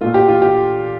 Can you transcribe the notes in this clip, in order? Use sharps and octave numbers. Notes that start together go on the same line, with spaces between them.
A#2 A3 F4
G4
F4
G4